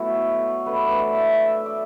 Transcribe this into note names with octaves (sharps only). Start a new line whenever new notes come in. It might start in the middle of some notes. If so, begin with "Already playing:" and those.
Already playing: B2 F#3 A3 E4 F#4 A4
D3 A3 B4
D5
B4
E5
E5
D5